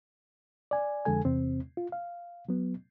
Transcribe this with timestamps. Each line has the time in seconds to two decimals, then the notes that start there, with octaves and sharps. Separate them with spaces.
0.71 D5 G#5
1.05 F2 D3 G#3 A4 G#5
1.25 E2 C3 C4
1.77 F4
1.92 F5
2.49 F#3 B3